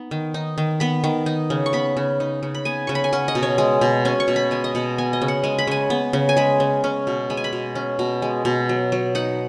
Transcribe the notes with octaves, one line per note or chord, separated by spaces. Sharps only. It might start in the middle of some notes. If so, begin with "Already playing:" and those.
Already playing: B3 D#4
D#3
D#4
D#3
B3 B5
D#3
D#4
C#3
C#6
B3 B5
C#3
D#4
C#3
B5
B3 G#5
C#3 C#6
B5
G#5
C#4 F#5
D#5
B2
C#5
G#3
B2
C#4 G#5
C#6
B2
B5
G#3 G#5
D#5
B2 F#5
B3 G#5
D#5
C#3
F#5
G#3 G#5
B5
C#3 G#5
B3
C#3
G#5
G#3 B5
C#3
C#4
B2
G#3 B5
G#5
B5
B2
C#4
B2
G#3
B2
F#3
F#3
D#4 F#5